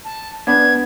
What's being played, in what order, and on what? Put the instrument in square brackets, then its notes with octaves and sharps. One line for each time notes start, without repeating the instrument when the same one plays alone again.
[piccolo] A5
[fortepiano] B3 D4 [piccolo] G#6